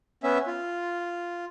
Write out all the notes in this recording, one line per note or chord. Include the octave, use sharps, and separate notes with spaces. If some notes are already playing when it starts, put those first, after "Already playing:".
B3 C#4 E5
F4